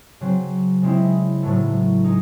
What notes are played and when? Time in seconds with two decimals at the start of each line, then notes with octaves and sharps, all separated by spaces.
0.21 C#3 F#3 C4
0.82 C#3 G#3 C4 E4
1.43 A2 F#3 A3
2.04 G#3 D#4